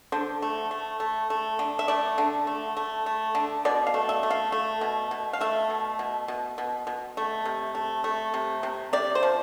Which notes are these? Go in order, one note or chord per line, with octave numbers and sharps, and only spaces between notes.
D3 C5
A3
A3
A3
A3
D3
E5
A3 D5
D3
A3
A3
A3
D3
B2 D5
F5
A3
E5
A3
F5
A3
B2
B2
F5
A3 E5
B2
B2
B2
B2
B2
A3
C3
A3
A3
C3
C3
C3 D5
C5
F3